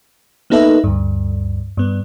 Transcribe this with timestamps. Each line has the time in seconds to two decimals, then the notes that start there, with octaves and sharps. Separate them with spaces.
0.50 A#3 B3 D#4 A4 B4 E5
0.84 D2 G2
1.77 G2 B3